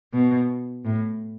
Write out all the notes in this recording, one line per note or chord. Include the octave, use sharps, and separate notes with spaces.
B2
A2